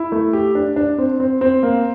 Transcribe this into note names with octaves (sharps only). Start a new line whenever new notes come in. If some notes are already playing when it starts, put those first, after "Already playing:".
Already playing: E4
A3
G4
D4
D4
C4
C4
C4
A#3